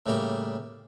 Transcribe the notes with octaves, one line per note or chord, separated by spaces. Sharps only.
A2 C#3 G3 A#3 G4